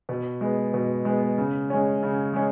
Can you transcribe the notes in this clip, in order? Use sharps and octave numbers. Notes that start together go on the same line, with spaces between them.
B2
G#3 B3
B2
G#3 B3
C#3
G#3 C#4
C#3
G#3 C#4